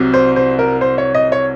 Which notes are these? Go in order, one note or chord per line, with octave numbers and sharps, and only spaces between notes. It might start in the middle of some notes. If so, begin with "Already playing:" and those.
Already playing: C2 C3 F#3
C5
C5
A#4
C5
C#5
D#5
C#5